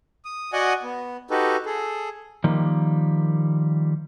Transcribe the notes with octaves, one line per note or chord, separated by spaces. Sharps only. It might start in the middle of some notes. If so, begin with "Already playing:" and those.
D#6
F#4 D5 D#5 F#5 G#5 D#6
B3
D#4 F#4 G4 A4 B4
G#4 A4
D#3 F3 G3 A#3